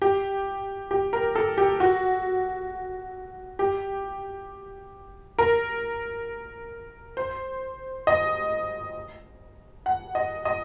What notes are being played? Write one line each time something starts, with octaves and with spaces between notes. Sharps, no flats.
G4
G4
A#4
A4
G4
F#4
G4
A#4
C5
D#5
F#5
D#5
D#5